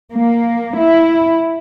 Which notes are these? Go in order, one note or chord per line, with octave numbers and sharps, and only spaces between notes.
A#3
E4